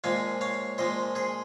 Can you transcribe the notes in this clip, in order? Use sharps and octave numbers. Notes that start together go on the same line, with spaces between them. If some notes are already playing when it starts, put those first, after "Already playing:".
A#2 F3 G#3 F5 G#5
C#5 F5
A#2 F3 G#3 C5 D#5
G#4 C5